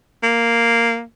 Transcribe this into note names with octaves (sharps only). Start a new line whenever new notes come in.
A#3